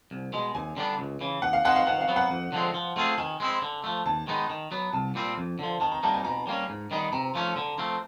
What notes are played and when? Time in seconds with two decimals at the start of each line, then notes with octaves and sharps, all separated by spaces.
0.11 C2
0.33 B2 G#3
0.55 D#2 G#5
0.77 D3 G3 B3 D4
0.99 C#2
1.21 C#3 E3
1.42 D#2 F#5
1.53 F5
1.65 D#3 G#3 F#5
1.75 F5
1.87 D#3 F#5
2.01 F5
2.08 F#3 B3
2.16 F#5
2.30 F2
2.52 D3 F3 G#3 C4
2.74 F3
2.96 A3 C4 F4 G#4
3.18 D#3 G#5
3.40 G#3 C4 E4
3.62 D3
3.84 F3 A3
4.06 D#2 A5
4.27 D#3 G#3 B3 D#4
4.50 D#3
4.72 F#3 B3
4.93 C2 A5
5.15 A#2 G3 C4
5.38 F2
5.59 D3 F3
5.81 D#3 A5
5.92 A#5
6.03 G3 A#3 D#4 A5
6.14 G#5
6.24 B2 A#5
6.47 G3 A#3 C#4
6.69 G#2
6.91 D#3 G3 B3 D#4
7.13 C3 A#5
7.35 F3 A3 C#4
7.56 D3
7.78 F3 A3 C4